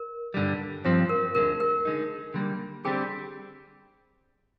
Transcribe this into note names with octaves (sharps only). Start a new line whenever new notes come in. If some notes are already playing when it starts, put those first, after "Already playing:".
Already playing: A#4
G2 D3 G3
G2 F3 C4 C5
A#4
D2 D3 G#3 A#4
A#4
D3 G#3 D#4
D3 G3 A#3
D3 G3 C4 G4 G#4